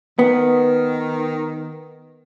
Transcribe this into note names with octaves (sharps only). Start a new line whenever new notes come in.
D#3 B3